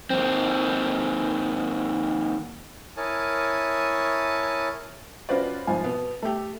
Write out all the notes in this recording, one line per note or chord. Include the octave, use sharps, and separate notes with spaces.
D#2 C4
E4 A#4 C#5 G#5 A5 D#6
C#4 F4 F#4 B4 C5 D5
G#1 F3 F4 G#5
B2 B3
A3 G4